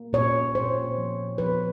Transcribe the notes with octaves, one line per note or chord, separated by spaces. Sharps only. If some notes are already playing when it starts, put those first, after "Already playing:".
Already playing: A#3
A#2 C#5
A#2 C5
F3
F3 B4